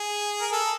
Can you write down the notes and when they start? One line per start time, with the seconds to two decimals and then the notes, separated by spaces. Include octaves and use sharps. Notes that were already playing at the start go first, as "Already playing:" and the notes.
Already playing: G#4
0.41 A#4
0.52 A4